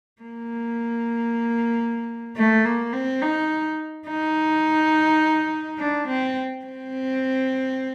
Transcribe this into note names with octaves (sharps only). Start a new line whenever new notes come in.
A#3
A3
A#3
C4
D#4
D#4
D4
C4
C4